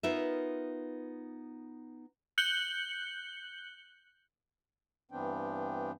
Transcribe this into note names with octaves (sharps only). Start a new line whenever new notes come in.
B3 D#4 F4 A#4 B4 E5
F#6 G6 C#7 F#7 G7
G2 E3 B3 C4 D4 G5